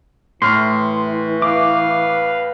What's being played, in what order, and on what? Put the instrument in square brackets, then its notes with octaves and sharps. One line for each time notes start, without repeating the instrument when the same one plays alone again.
[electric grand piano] A2 F6 [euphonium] E3 [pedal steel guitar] C6
[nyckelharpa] B4 F5 [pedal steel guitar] D6